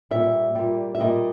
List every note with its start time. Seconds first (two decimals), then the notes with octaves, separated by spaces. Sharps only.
0.11 A#2 G3 E5
0.55 A#2 G3
0.95 E5
1.00 A#2 G3 D#5